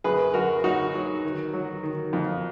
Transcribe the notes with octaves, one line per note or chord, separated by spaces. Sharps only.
F#2 G#4 B4
F#2 F#4 A#4
F#3 D#4 F#4
F#3
D#3
F#3
D#3
F2